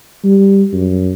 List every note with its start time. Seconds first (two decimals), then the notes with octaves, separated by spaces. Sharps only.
0.24 G3
0.73 F#2